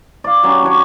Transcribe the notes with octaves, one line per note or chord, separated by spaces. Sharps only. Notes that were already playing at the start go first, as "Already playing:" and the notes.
D5 F5
F#3 C#4 G4
D4 F#4 C#5 D6